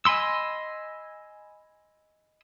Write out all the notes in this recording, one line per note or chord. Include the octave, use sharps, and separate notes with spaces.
D#5 G#5 B5 C6 E6